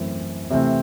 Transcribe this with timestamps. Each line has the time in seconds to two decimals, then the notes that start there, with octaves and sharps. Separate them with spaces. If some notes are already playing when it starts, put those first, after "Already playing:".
Already playing: F#2 E3 A3 C4 E4
0.50 C3 E3 A3 C4